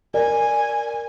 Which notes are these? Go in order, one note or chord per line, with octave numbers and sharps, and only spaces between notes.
A#4 D5 G#5